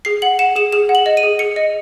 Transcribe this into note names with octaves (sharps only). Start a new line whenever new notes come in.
G#4 C7
F#5 F#7
F#5 E7
G#4 E7
G#4 E7
F#5
F#7
D#5
D#7
G#4
G#4 C#7
D#5